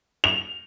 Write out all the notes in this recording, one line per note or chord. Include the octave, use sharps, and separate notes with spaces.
F7